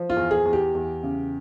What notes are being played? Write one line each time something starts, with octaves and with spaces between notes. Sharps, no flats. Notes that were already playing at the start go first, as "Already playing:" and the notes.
Already playing: F3
F4
E2
G#4
E2
G4
E2
C#3